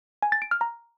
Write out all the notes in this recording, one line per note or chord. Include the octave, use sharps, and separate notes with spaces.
G#5
A6
D7
F6
A#5